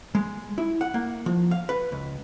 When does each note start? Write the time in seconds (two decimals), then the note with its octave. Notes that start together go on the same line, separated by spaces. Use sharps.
0.15 G#3
0.58 E4
0.81 F#5
0.94 A#3
1.26 F3
1.51 F5
1.69 B4
1.92 C#2